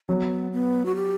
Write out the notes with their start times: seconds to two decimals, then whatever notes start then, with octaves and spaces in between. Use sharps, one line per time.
0.08 F#3 B3 C#4
0.52 B3
0.86 F#4
0.96 G4